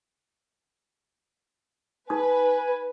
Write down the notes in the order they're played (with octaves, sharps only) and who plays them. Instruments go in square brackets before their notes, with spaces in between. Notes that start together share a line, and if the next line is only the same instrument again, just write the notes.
[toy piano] D#4 D#6 [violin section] B4 [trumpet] G#5